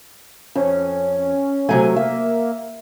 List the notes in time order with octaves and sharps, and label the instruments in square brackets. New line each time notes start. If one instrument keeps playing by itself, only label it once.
[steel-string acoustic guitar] F2 [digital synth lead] C#4
[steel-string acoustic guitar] C3 F#3 A3 [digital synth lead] G#5
[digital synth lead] A#3 [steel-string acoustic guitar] E5